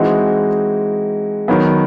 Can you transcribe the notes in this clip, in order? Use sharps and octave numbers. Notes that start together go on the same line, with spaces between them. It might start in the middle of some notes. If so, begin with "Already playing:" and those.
Already playing: E3 G#3 C4 D#4 F#4
D#3 F#3 B3